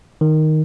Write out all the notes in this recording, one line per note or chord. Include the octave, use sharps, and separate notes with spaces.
D#3